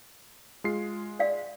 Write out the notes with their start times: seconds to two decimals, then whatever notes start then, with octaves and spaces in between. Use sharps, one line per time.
0.64 G#3 F4 C7
1.19 D5 F5